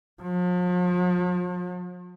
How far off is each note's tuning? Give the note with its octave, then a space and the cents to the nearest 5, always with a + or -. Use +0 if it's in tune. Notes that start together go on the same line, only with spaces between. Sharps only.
F3 +40